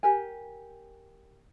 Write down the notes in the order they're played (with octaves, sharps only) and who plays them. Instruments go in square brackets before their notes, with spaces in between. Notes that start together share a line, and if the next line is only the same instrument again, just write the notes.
[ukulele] G4 A#4 G#5